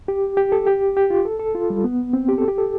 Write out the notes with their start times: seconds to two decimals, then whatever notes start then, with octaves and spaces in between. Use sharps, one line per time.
0.08 G4
0.37 G4
0.52 A4
0.67 G4
0.97 G4
1.10 F4
1.25 A4
1.40 A4
1.55 F4
1.70 G3
1.84 B3
2.13 C4
2.29 G4
2.38 A4
2.48 G4
2.58 A4